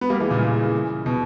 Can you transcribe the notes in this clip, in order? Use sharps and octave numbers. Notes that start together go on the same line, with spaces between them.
B3
G3 A#3
E3 G#3
A#2 C#3
B2